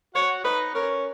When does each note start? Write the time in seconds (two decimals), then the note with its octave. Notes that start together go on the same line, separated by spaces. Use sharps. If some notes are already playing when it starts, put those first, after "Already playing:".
0.15 F#4 C#5 F#5
0.44 D#4 B4 D#5
0.75 C#4 A#4 C#5